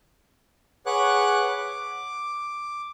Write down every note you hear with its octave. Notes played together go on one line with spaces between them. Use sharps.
G#4 B4 C#5 F#5 D6 F#6
D6